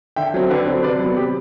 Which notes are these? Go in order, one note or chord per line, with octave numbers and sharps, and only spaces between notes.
D3 E5 G5
F#3 C4
D3 B4 D5
F#3 C4
C3 B4 D5
F#3 B3
C3 G4